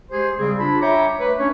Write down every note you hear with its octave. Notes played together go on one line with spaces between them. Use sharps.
G#3 G4 G#4 C5
C#3 G3 C4 G#4
D4 F4 A5 B5
C#5 E5 G5 A#5 D6
A3 B4
C#4 D4 C#5